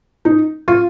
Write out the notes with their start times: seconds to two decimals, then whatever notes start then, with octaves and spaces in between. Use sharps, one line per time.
0.25 D#4
0.68 F4